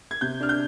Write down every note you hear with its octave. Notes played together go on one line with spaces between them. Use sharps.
G#6
C3 G6
D4 F6
G6